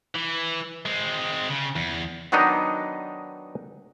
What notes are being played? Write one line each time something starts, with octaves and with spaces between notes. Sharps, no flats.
E3
G#3 C4
C#3
E2
D#3 F#3 B3 D4 D#4 D#5